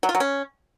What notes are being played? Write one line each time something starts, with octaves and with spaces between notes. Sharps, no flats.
F#3
F4
F#3
C#4